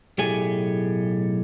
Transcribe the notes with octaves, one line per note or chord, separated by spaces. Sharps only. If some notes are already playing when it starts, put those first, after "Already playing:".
B1 A2 A3 G4 G#4 G#5